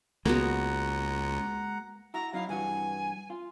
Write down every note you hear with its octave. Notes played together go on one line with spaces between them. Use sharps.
C#2 G#3 A#3 B3 F#4 F#5 A#5
E4 F#4 A#5
F#3 D#4 E4 F5
G2 E3 F#4 G#5
F4